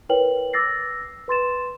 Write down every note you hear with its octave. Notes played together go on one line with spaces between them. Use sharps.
E4 A#4 B4 C#5 G5 F#7
D6 E6 A6 A#6 C7
B4 C6 A6 E7